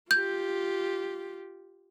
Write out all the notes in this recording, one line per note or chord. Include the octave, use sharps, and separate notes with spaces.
F4 G4 G6